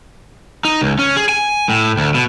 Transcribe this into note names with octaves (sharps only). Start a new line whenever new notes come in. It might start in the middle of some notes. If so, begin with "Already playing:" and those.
D#4
C#2
C#4
G#4
G#5
A2
D2
B2